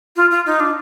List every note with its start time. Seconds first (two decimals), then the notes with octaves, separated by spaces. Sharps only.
0.16 F4
0.31 F4
0.46 D#4
0.60 D4